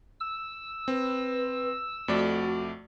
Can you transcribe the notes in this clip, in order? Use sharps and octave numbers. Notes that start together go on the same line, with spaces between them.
E6
C4 B4
F2 A3 F#4 D5